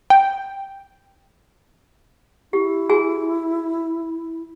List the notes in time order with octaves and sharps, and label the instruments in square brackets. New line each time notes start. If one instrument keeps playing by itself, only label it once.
[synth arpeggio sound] G5
[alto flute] E4 [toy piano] G4
[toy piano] F#4 G#4 G#5